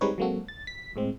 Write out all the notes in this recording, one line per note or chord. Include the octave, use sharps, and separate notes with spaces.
G3 G#3 C4 D#4 B4 C#5
F#3 G#3 A#3 C4 F#4 A4
A6
B6
A2 G#3 C4